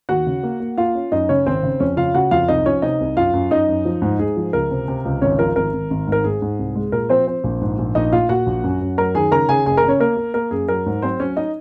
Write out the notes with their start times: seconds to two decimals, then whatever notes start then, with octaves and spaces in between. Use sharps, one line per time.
0.09 D#2 F#4 F#5
0.26 C#3
0.43 A#3
0.60 A#3
0.78 A#3 F4 F5
0.95 C#4
1.12 F#2 D#4 D#5
1.29 C#3 C#4 C#5
1.46 G#1 C4 C5
1.63 C#3
1.80 F2 C#4 C#5
1.97 C#3 F4 F5
2.14 C#3 F#4 F#5
2.31 F2 F4 F5
2.48 C2 D#4 D#5
2.66 F3 C#4 C#5
2.82 C3 D#4 D#5
3.00 C2
3.16 F#2 F4 F5
3.34 F#2
3.51 F#2 D#4 D#5
3.68 F#2
3.85 F3
4.02 G#2
4.19 G#2 G#4
4.37 F3
4.53 C#2 A#4
4.71 C3
4.88 C3
5.05 C#2
5.21 G#1 C#4 C#5
5.39 F3 A#4
5.56 G#1 A#4
5.73 G#1
5.90 G#1
6.07 G#2
6.12 A#4
6.24 G#2 G#4
6.42 G#2
6.59 C2
6.75 G#3
6.92 A#2 A#4
7.09 F3 C4 C5
7.27 C4
7.44 A#1
7.61 G#2
7.78 A#1
7.95 A#1 D#4 D#5
8.13 A#2 F4 F5
8.29 A#2 F#4 F#5
8.46 A#1
8.64 F#2
8.81 F#2
8.98 F#3 A#4 A#5
9.15 D#3 G#4 G#5
9.32 C#3 A#4 A#5
9.49 C#3 G#4 G#5
9.66 F#1 G#4 G#5
9.77 A#4 A#5
9.83 C#3
9.88 C#4 C#5
10.00 A#3 A#4
10.17 A#3
10.34 A#3 A#4
10.51 F#2 G#4
10.68 F#3 A#4
10.86 G#2
11.02 F#3 C4 C5
11.20 F#3 C#4 C#5
11.37 D#4 D#5